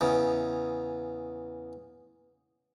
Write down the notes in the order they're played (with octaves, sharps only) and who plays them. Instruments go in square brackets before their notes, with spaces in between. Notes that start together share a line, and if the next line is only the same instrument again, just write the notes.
[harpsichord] E2 C#3